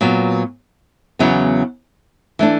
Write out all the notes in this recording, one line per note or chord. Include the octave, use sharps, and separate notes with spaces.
A#2 F#3 B3
E2 C#3 F#3 B3
E3 A3 D4